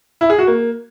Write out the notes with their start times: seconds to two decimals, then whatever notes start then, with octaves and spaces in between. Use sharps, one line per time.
0.21 E4
0.30 G#4
0.38 F#4
0.47 A#3